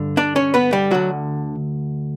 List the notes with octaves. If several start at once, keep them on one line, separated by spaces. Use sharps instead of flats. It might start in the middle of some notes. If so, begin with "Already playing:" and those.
Already playing: G2 D3
D4 D5
C#4 C#5
B3 B4
G3 G4
D2 D3 F#3 F#4